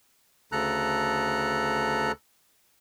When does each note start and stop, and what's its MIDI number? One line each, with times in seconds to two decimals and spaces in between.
0.52 2.12 38
0.52 2.12 49
0.52 2.12 69
0.52 2.12 82
0.52 2.12 90